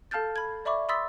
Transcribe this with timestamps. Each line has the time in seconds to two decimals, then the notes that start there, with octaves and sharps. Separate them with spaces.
0.11 A4 F5 A5 F6 G6 A6
0.36 B5 G#6
0.65 D5 E5 B5 C#6 D6
0.89 B5 C6 D#6 E6 A6 B6